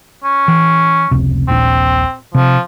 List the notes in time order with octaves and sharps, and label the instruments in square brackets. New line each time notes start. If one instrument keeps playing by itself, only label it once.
[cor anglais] C#4
[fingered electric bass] E3
F1 C#2 C3
[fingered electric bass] D#1 A#1 D4 [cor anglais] C4
[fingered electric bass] C3 [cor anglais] F3